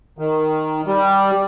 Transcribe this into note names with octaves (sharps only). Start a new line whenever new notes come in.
D#3
G3